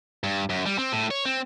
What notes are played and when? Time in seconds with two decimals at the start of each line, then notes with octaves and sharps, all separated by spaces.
0.24 G2
0.50 F#2
0.66 G3
0.78 C4
0.92 A2
1.11 C#5
1.25 C4